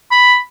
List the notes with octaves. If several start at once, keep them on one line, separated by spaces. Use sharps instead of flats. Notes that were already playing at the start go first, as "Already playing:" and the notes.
B5